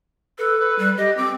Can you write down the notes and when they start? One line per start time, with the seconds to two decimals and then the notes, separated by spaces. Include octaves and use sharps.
0.38 A4 B4
0.60 B4
0.79 G3
0.97 G4 D#5
1.17 C4 D6